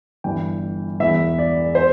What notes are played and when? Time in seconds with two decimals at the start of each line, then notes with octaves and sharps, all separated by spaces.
0.24 G1 G2 E3 G5
1.00 E1 E2 E3 E5
1.39 D5
1.75 C5